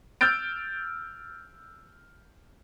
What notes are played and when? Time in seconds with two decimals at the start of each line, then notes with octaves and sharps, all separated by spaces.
0.21 E6 F6 G6 A6 D7